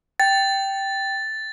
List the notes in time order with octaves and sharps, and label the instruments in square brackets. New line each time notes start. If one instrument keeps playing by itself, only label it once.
[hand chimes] G5 [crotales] A6